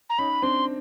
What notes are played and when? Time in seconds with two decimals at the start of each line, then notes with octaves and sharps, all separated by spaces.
0.10 A#5
0.18 C#4 D#4 B5
0.42 C4 D4 C6